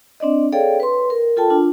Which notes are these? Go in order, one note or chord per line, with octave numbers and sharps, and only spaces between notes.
C4 D4 D5 D#5
G#4 A4 C#5 D5 F5 G5
B4 C6
A#4
F4 A4 G5 A5
D4 F4